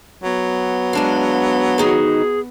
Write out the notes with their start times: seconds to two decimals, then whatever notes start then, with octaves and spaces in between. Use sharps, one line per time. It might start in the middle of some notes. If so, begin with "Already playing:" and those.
0.23 F#3 B3
0.93 G#3 D4 F5
1.78 D#3 D#4 F#4 G#4